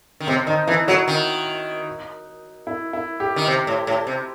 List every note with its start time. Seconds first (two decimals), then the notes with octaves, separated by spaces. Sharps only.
0.20 D#3
0.27 C3 C4
0.47 D#3 D#4
0.67 E3 E4
0.87 F#3 F#4
1.08 D#3
2.67 E4
2.93 E4
3.20 G4
3.36 D#3
3.47 C3
3.67 A2
3.87 A2
4.07 C3